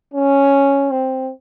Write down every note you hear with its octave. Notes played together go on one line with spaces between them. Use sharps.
C#4
C4